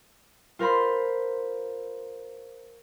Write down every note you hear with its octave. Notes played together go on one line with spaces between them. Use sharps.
F4 A#4 C5 B5 C6